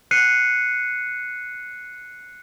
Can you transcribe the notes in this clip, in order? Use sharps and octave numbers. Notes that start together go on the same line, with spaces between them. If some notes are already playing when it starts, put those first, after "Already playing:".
F#6 C7 C#7 D#7